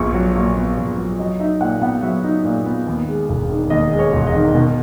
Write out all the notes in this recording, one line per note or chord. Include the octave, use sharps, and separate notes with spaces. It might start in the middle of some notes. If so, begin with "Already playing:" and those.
Already playing: A#1 A#2 B3 C#6
F#3
A#2
B3
A#1
F#3
F#3 D#5
D#4 E5
A#2 F#5
B3 F#5
F#3 E5
D#4
A#2
B3
D#2
G#3
E1
D#3
D#2 D#5
G#3
C#5
E1
D#5
D#3
B2